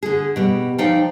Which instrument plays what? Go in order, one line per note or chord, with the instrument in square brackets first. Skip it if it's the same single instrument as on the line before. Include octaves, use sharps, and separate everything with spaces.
[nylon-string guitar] D3 G#4
B2 G3
F3 D#4 D5 F5 G5